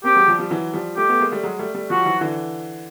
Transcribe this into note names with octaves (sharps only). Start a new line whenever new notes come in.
A#3 C4 G4
F#3 G#3
F3 G3
F3 G3
E3 F#3
F3 G3
G3 A3 G4
A3 B3
G#3 A#3
G3 A3
F#3 G#3
G3 A3
G3 A3
F3 G3 F#4
E3 F#3
D3 E3